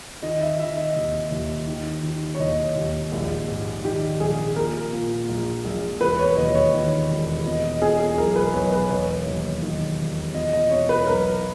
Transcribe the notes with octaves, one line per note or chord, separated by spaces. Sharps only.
D#3 D#5
E5
D#3 E5
D#5
D#2
D#2
D#3
D#3
C#5
D#2 D#5
D#2
A#1
G#2
D#3 G4
A#1 G#4
A#2 A#4
A#2
A#1
A#1
E1 B4
C#5
D#2 D#5
C#5
D#3
E1
B2 D#5
D#5
B2 G#4
G#4
B1 A#4
B4
B1 C#5
B4
E1 C#5
D#2
D#3
E1
B2 D#5
D#5
B2 C#5
B4
B1 A#4